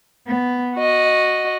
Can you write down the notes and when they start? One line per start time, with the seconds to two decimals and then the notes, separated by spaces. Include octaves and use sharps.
0.27 B3
0.77 F#4 D#5